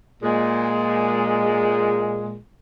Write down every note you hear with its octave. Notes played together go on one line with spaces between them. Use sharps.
A#2 G#3